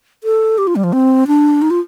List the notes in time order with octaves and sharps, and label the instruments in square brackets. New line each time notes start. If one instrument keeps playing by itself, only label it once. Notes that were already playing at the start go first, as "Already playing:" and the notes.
[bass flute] A4
G4
F4
G3
F3
C4
D4
D#4
F4